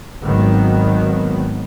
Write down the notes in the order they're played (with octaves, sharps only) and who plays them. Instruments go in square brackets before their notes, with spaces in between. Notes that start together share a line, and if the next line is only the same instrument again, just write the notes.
[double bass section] G#1 D#3 F#3 B3